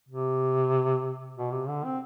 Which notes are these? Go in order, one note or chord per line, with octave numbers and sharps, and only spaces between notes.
C3
B2
C3
D3
C4